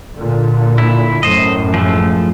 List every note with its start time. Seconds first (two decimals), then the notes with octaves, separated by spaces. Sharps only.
0.15 A#2 D3
0.78 E4
1.23 F#2 A2 C5 D#5
1.74 F3 G#3 A3